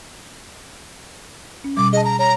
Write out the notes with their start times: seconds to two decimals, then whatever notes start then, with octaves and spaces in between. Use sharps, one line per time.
1.64 C#4
1.77 B2 G3 D6
1.93 G#4 D#5 A5
2.05 A#5
2.19 C#5 A#5